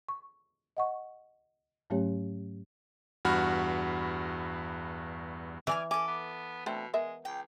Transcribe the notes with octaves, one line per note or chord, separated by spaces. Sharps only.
C#6
D#5 F#5 C#6
G#2 F#3 A3 C#4 G4 C#5
E2 G2 F#4 B5 F6
E3 D5 E5 G#5 F6
C#4 A4 G#5 D6
B3
B2 A3 C4 D4
G#3 B3 A#4 E5
C#2 G5